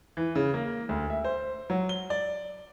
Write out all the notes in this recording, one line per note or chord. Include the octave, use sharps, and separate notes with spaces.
E3
C#3
A#3
D2
E5
C5
F#3
G7
D5